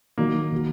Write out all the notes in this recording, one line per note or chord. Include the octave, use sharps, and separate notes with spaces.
D#3 F#3 A#3 D#4 F#4
D#3 A#3 F#4